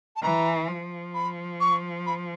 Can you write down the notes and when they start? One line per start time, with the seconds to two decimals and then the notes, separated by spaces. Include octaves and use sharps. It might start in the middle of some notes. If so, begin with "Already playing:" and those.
0.16 A5
0.23 E3 A#5
0.69 F3
1.14 B5
1.60 C#6
2.06 B5